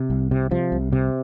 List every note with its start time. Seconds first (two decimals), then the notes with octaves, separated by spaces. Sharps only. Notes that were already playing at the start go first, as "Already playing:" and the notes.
Already playing: C3
0.10 C2
0.31 C3
0.51 C3 F3
0.72 C2
0.92 C3